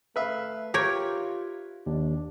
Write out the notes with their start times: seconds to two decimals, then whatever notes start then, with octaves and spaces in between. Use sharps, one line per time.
0.16 A3 B4 E5 F5
0.74 F4 G4 A#4 C#5
1.86 D#2 D4